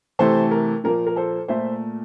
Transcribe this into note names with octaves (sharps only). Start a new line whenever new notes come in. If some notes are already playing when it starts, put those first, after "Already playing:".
C3 E3 A3 A4 C5
A#4
A#2 F3 A#3 A#4
A#4
A4 C5
A#2 A3 C5 E5